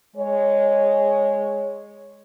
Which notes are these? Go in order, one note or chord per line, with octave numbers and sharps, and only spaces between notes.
G#3 C#5